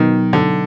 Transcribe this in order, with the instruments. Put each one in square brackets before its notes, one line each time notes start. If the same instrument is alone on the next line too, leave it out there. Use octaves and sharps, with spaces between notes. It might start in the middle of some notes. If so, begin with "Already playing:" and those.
Already playing: [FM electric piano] B2 F#3 B3 D#4 [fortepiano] D#3
[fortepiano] D3